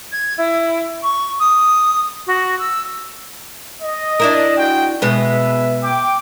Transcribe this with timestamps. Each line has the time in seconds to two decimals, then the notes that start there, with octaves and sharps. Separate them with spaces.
0.12 G#6
0.38 E4
1.03 C#6
1.40 D#6
2.27 F#4
2.59 E6
3.82 D#5
4.20 D4 E4 A#4
4.57 G#3 F#4 G5
5.02 B2 G#3 B3 B4 E5
5.83 G5 D6